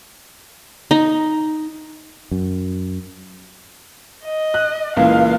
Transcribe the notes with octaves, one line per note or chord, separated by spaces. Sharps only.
D#4
F#2
D#5
F#6
C#2 A#2 E3 F5